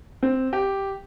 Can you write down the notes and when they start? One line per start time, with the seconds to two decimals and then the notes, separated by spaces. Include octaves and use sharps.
0.23 C4
0.53 G4